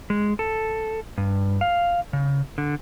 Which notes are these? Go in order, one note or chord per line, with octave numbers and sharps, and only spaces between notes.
G#3
A4
G2
F5
C#3
D3